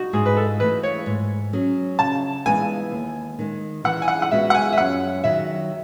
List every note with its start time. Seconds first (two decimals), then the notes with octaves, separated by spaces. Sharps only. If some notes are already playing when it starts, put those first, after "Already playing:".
Already playing: D#4 F#4
0.13 G#2 G#4
0.26 B4
0.37 A4
0.60 E3 A3 B4
0.83 C#5
1.06 G#2
1.53 F#3 C#4 G#4
1.99 C#3 A5
2.46 E3 G#3 B3 G#5
2.92 D#2
3.39 D#3 G#3
3.84 E3 F#5
4.02 G#5
4.08 F#5
4.22 F#5
4.31 G#3 B3 F#4 E5
4.50 F#5
4.55 G#5
4.73 E5
4.78 F#2 F#5
5.24 D#3 F#3 E5